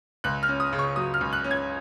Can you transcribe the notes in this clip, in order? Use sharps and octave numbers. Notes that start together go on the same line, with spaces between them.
C#2 F#6
F6
C#4
D#6
C#3
C#6
F#3 D#6
F6
C#2
F#6
C#4
G#6